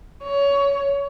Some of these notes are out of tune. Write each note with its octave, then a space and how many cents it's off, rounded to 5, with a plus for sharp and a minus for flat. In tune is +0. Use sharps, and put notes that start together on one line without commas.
C#5 +20